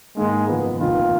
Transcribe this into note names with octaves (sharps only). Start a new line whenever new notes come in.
G#2 D#3 G#3 A#3
F#1 F#2 F3 B3
F1 D#2 D#3 F4